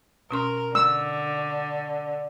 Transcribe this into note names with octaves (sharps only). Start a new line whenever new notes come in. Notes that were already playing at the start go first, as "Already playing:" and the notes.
B2 C#4 A#4 C6
D3 E6